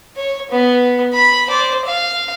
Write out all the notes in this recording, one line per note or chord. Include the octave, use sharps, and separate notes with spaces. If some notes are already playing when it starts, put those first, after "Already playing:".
C#5
B3
B5
C5 D5
F5